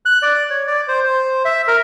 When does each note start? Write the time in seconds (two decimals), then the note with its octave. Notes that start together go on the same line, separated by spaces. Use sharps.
0.06 F#6
0.22 D5
0.50 C#5
0.67 D5
0.88 C5
1.03 C5
1.45 E5
1.68 A#4